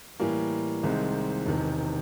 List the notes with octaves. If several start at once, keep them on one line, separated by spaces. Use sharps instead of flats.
A2 E3 G3 A#3
C2 C3 D#3 G#3 C4
E1 E2 C3 D#3